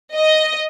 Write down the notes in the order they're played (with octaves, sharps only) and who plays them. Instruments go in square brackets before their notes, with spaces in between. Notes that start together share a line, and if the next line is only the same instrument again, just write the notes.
[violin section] D#5